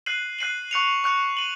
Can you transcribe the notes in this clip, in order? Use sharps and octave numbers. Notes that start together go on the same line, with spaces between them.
F#6 C7 D#7 F#7
F#6 C7 D#7 F#7
C#6 F#6 C#7 F7
C#6 F#6 C#7 F7
D#7 F#7